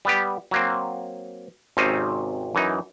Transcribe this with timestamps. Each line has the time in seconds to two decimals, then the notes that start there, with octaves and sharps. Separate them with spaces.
0.05 G3 B3 G4
0.51 F#3 A#3 C4
1.77 G#1 C3 C4 C#4 D#4
2.55 F#2 E3 D#4